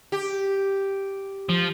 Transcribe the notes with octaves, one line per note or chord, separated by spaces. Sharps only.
G4
F3